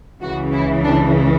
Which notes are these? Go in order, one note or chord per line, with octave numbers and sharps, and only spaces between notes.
C#2 C#3 E3 F#4
E4
D4